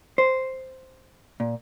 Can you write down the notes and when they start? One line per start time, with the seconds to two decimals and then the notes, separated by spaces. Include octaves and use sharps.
0.18 C5
1.40 A#2